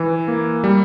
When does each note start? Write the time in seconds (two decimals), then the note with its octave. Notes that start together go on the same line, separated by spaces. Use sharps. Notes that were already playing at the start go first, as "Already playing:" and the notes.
Already playing: E3
0.28 A#3
0.64 G3